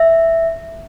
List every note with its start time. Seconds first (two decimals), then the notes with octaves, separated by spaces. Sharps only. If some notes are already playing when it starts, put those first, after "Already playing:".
Already playing: E5